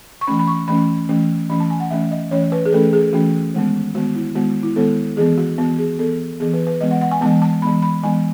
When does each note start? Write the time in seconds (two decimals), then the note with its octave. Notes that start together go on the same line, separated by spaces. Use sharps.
0.21 C#6
0.27 E3 A3 C#4 B5
0.39 B5
0.47 C#6
0.68 E3 A3 C#4 B5
1.09 E3 A3 C#4
1.50 E3 A3 C#4 B5
1.60 A5
1.70 G#5
1.80 F#5
1.90 E3 A3 C#4 E5
2.11 D#5
2.31 E3 A3 C#4 C#5
2.52 B4
2.65 G#4
2.72 E3 A3 C#4 A4
2.93 G#4
3.13 E3 A3 C#4 F#4
3.54 D#3 G#3 B3
3.95 D#3 G#3 B3 F#4
4.15 E4
4.35 D#3 G#3 B3 F#4
4.63 E4
4.76 D#3 G#3 B3 A4
5.17 E3 B3 G#4
5.38 F#4
5.58 E3 B3 F#4
5.78 G#4
5.99 E3 B3 A4
6.40 E3 B3 G#4
6.53 B4
6.67 B4
6.80 E3 G#3 B3 D#5
6.91 F#5
7.01 F#5
7.11 G#5
7.21 E3 G#3 B3 A5
7.42 A5
7.62 E3 G#3 B3 B5
7.82 B5
8.03 E3 G#3 B3 G#5